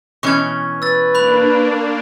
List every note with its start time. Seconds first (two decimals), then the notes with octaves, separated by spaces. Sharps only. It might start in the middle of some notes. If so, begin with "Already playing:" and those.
0.23 B2 E3 C#4 C#6 G#6
0.82 B4 E6 A6
1.15 A#3 D4 B5 F#6 F7